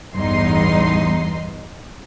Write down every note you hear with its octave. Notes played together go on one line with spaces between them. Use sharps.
A1 E2 G2 D#4 C6